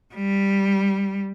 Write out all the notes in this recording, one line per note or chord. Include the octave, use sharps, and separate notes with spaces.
G3